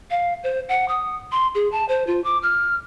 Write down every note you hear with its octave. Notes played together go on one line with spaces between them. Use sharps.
F5
C5
F#5
D#6
C6
G#4
A5
C5
F4
D6
F6